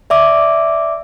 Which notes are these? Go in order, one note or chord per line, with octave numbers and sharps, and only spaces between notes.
D5 E5 D6